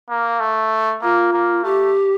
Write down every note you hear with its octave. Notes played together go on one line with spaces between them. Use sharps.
A#3
A3
A#3 F4
A#3
A3 G4